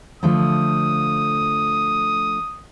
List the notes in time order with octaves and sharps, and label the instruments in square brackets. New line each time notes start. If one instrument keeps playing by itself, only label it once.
[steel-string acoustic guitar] D3 F3 A3 [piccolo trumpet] D#6